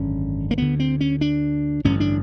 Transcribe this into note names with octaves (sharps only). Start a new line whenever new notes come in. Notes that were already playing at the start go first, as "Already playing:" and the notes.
Already playing: G#1 F#2 D3 C#4
A#3
D2 D3 B3
C4
C#4
D4
A1 G2 D3 C#4
D4